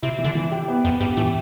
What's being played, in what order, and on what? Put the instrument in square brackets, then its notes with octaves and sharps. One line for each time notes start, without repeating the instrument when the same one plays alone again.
[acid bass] C3 [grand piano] E4
[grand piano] E3
[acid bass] D3
[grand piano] E3
G4
B3
[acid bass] F2 [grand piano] B3
[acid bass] G2 [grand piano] G4
[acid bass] A2 [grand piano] E3